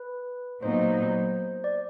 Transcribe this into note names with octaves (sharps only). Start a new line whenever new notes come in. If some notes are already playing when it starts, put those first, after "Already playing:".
Already playing: B4
A#2 F#3 B3 D#4 C5
D5